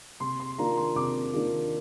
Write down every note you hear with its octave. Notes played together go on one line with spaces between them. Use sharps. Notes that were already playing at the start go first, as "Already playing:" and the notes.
C3 C6
C6
D#3 A#3 D4 F4 A#5
C6
C3 D6
D#3 A#3 D4 F4